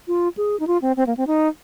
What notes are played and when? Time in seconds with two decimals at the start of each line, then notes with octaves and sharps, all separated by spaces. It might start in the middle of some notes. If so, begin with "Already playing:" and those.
0.08 F4
0.37 G#4
0.60 D#4
0.67 F4
0.82 C4
0.97 C4
1.07 A#3
1.17 C4
1.27 D#4